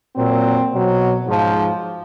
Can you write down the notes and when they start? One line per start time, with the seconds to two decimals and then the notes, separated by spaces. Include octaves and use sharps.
0.15 A#2 F#3 C4
0.71 B2 F#3
1.26 G#2 F3